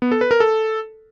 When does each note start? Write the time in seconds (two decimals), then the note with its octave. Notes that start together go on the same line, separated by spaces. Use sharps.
0.02 B3
0.12 A4
0.21 B4
0.31 A#4
0.40 A4